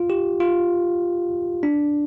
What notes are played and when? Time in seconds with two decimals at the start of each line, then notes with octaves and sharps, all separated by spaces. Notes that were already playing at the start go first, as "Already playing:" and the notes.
Already playing: F4
0.10 G4
0.40 F4
1.63 D4